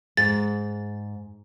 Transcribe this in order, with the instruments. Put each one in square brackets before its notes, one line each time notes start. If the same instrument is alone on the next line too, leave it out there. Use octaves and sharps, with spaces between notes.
[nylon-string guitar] G#2 [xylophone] A6